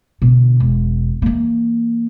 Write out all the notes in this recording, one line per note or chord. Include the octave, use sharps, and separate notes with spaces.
B2 D3
E1
E3 A#3